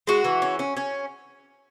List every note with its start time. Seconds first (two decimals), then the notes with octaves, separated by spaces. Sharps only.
0.07 G#3 F#4
0.24 E3
0.42 C#4
0.59 C#4
0.77 C#4